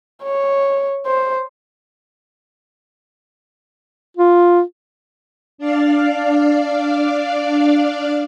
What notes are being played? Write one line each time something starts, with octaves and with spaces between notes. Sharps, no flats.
C#5
C5
F4
D4 D5 F5